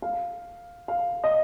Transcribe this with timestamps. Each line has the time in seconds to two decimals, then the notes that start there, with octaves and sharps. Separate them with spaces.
0.02 F5
0.88 F5
1.24 D#5